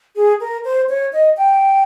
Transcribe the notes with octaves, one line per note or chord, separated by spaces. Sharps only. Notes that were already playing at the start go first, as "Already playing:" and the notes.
G#4
A#4
C5
C#5
D#5
G5